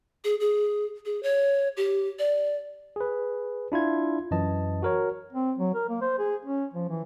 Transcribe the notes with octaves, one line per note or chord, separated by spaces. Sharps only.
G#4
G#4
G#4
C#5
G4
D5
G#4 B4
D4 E4 F4 G#6
F#2 E3 D#5 A5
F#4 A#4 C#5
C4
F#3
A#4
A#3
C5
G#4
C#4
F3
E3